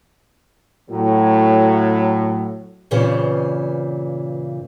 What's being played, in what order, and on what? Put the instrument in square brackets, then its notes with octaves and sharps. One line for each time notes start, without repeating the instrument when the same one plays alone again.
[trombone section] A2 F#3
[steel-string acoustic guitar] G2 A#2 C#3 E3 C4